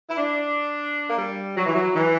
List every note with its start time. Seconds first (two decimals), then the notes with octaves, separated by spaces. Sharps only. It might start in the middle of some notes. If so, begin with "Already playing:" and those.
0.08 E4
0.18 D4
1.09 A#3
1.18 G3
1.57 F#3
1.66 E3
1.75 F#3
1.95 E3